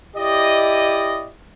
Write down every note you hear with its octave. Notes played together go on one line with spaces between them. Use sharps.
E4 G4 D5 D#5